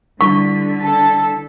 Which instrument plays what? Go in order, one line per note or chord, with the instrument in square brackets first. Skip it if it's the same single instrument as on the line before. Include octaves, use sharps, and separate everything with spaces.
[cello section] D3 [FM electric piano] G3 E4 B6 [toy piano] C#6
[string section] A4